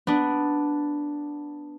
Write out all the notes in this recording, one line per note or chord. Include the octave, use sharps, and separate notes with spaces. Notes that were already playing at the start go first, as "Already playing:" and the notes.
B3 D4